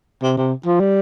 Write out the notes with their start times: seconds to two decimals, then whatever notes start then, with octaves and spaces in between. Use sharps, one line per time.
0.23 C3
0.38 C3
0.66 F3
0.80 G3